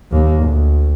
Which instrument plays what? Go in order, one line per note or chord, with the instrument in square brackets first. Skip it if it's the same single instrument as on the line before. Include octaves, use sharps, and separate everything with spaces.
[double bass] D#2 A#3
D2